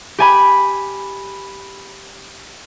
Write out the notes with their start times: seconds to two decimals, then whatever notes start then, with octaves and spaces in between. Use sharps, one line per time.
0.18 G4 G#5 B5